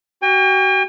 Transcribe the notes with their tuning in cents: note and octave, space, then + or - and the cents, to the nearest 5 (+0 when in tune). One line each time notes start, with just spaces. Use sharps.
F#4 +35 G5 +45